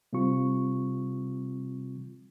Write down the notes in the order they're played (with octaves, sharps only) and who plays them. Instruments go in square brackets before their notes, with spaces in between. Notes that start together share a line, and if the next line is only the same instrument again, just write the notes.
[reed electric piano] C3 G3 C4 F4 C#6